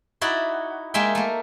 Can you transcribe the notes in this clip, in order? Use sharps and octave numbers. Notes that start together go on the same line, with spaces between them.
D#4 E4 F#4 D5
G#3 A#3 E5 G5
A3 A#3